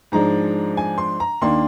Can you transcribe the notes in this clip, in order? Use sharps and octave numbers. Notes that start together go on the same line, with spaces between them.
G#2 F3 G#3 D4 A#5
G#5
C6
A#5
D#2 D#3 A#3 D4 C6